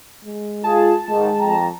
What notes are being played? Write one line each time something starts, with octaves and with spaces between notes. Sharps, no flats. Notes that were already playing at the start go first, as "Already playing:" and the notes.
G#3
F4 G#4 A5
G#2 D#3 G#3
F2 G5 A#5